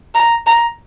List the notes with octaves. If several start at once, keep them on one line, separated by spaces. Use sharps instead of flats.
A#5
A#5